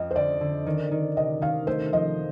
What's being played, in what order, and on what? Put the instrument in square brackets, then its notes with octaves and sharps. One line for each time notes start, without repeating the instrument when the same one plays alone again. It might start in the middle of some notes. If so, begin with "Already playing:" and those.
Already playing: [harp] F2 [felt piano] D#5
[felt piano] C5
[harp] D3 [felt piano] D5
[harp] D3
D#3
D#3
[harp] C3 [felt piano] D#5
[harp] D#3 [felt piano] F5
[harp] A3 [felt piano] C5
[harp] F3 [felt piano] D#5